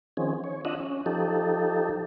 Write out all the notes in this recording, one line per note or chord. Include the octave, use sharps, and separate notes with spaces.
D#3 F3 C4 C#4 G#4
C#5
D4 F4 D#5 E5 F#5
C#4
F3 D#4 G4 A4